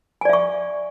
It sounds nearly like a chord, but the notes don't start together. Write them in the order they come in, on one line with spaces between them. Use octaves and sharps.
G#5 D5 E5 C#6